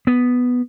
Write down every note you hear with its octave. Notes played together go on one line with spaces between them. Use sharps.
B3